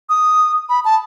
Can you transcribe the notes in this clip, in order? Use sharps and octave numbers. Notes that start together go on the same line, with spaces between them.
D#6
B5
A5